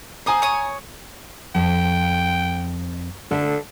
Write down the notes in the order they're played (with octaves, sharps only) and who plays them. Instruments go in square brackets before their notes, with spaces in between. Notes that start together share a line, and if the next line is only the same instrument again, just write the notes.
[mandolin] C5 D#6 [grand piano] G#5 A#5
[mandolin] C#5 D#6
[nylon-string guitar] F2 [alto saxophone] G5
[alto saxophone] D3 [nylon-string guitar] A4 E5